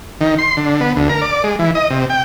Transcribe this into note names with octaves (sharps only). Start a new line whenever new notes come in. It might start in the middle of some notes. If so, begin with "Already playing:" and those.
D#3
C6
D3
B3
D2
A#4
D5
G#3
E3
D#5
C3
G5